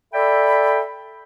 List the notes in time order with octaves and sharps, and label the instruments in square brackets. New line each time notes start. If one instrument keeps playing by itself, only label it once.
[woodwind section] A4 D5 E5 G5 B5